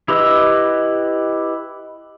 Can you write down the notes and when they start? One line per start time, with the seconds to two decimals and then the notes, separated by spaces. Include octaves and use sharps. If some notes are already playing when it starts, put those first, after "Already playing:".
0.08 E4 G4 B4 D#5 E6